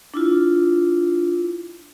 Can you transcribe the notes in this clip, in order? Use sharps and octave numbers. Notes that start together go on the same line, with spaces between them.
D4 E4 F4